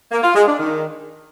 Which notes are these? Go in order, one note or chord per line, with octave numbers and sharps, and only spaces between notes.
A#3
F4
G#3
D4
D#3